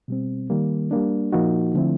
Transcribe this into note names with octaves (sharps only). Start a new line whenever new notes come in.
B2 G3 C4
D#3 G3 A#3
G3 A#3 D4
A#2 F3 A#3 D#4 F#4
D3 F3 A3 C4 E4